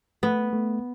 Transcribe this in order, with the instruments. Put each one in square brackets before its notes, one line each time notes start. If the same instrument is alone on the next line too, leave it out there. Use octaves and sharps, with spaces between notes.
[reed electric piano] A3 [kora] B3
[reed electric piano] A3